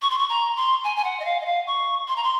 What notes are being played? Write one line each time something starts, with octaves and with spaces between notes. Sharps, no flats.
C#6
C6
C#6
A#5
C6
G#5
G#5
F#5
D#5
F5
D#5
F5
C#6
C6
A#5
C6